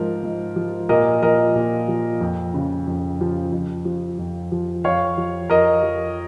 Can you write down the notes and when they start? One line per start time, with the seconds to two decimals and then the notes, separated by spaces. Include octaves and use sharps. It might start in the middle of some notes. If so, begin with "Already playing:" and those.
Already playing: G#2 F3 A#4
0.23 G#2
0.56 F3
0.89 A#2 A#4 D#5
1.22 F3 A#4 D#5
1.55 A#2
1.88 F3
2.21 F2
2.54 C#3 F3
2.87 F2
3.20 C#3 F3
3.52 F2
3.85 F3
4.19 F2
4.52 F3
4.84 F2 C#5 F5
5.17 F3
5.50 F2 A#4 D#5
5.83 F3